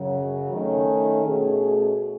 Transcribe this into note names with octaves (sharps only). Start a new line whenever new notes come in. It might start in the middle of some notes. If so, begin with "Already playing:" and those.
Already playing: F#2 C#3 F#3
D#3 A3 C#4
B2 A3 C#4 G#4